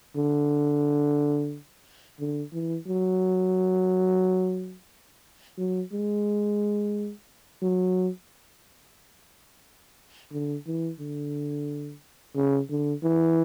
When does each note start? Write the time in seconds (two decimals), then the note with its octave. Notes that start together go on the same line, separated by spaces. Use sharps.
0.16 D3
2.19 D3
2.53 E3
2.87 F#3
5.58 F#3
5.93 G#3
7.62 F#3
10.32 D3
10.67 E3
11.00 D3
12.36 C#3
12.70 D3
13.03 E3